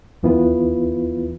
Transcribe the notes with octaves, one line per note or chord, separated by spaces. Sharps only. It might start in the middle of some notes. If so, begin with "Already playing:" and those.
D#2 E3 B3 E4 F4 B4